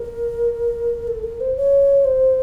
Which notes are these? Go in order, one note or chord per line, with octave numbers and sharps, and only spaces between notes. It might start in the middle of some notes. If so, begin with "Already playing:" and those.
Already playing: A#4
A4
A#4
C5
C#5
C5